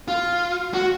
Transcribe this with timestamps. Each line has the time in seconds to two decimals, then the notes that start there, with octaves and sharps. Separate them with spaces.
0.08 F4
0.74 F#4